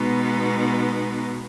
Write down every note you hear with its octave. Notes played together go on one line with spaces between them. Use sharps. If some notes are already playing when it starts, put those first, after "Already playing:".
Already playing: B2 G#3 B3 D#4